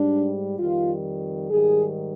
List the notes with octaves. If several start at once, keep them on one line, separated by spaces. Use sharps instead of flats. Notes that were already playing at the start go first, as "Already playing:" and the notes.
Already playing: G#2 G3 D4
F2 D#3 G3 F4
G#2 D#3 G3 G#4